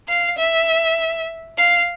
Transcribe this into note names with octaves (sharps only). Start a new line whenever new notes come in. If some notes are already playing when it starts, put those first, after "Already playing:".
F5
E5
F5